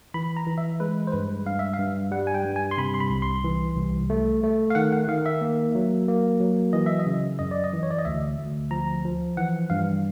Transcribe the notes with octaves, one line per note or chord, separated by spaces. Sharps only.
E3 B5
A#5
E3
E5
G#3 B4
C5
G2 B4
G2 F5
E5
F5
G2
G3 F#5
G#5
G5
G2
G#5
C6
C3 B5
C6
B5
C2
C6
E3
C2
A3
A3
F5
D#3 F#5
F#5
D#3 F5
E5
A#3
F#3
A#3
F#3
E3 D#5
E5
D#5
C#3
F#2 D#5
D5
D#5
E3
C#5
D5
D#5
D2 E5
D2
F3 A#5
F3
E3 F#5
G2 F5